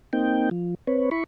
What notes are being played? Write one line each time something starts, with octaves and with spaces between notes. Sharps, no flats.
A#3 C4 D#4 G5
F3
C4 B4 C#5
E4 B5 C#6